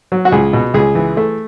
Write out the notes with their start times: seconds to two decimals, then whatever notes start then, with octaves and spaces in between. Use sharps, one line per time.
0.12 F#3
0.25 F#4
0.32 C#2 G#4
0.53 B2
0.74 C#2 G#4
0.95 E3
1.17 A3